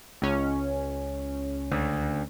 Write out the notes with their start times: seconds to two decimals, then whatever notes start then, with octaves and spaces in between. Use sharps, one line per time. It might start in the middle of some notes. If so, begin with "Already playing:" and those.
0.22 C#2 C#4
1.72 D2